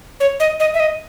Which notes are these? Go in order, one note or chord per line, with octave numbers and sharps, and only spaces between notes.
C#5
D#5
D#5
E5
D#5